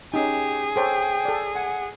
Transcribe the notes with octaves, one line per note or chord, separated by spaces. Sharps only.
C#4 D#4 G4 G#4
A4 C5 C#5 G5
A4 D5
F#5 G#5